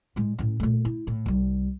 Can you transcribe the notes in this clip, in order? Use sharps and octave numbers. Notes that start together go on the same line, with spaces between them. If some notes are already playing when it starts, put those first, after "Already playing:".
A2 G#3
A2 C#4
A#2 A3
E4
A2
C2 G3